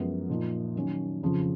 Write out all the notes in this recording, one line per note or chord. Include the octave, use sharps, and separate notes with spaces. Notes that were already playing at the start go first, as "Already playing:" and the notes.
Already playing: F#2 F3 G#3 B3
A#2 F3 A#3 D#4
D#3 F#3 C#4
F2 C#3 F3